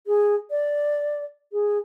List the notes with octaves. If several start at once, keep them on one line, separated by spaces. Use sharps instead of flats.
G#4
D5
G#4